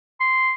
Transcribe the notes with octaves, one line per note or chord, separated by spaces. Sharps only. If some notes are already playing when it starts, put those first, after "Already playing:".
C6